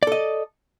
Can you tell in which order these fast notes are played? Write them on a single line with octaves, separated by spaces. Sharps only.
D5 A4 D#5